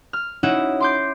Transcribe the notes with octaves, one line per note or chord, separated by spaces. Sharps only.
F6
C#4 D#4 E4 F#4 E5 F#5
C6 D6 G6